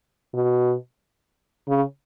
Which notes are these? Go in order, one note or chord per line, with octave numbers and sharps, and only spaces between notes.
B2
C#3